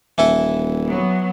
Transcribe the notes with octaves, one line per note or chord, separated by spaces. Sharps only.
D#1 E3 E4 A4
F#3 B3